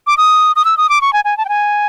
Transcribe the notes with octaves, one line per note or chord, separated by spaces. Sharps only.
D6
D#6
D#6
E6
D#6
D6
C#6
G#5
G#5
A5
G5
G#5